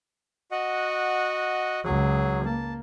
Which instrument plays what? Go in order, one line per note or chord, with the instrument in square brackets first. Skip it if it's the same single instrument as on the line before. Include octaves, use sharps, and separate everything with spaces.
[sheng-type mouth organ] F#4 D#5 F#5
[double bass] C#2 F#3 [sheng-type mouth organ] G#4
[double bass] A#3 [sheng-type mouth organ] A5